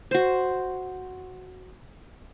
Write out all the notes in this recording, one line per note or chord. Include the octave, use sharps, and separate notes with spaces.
F#4 C5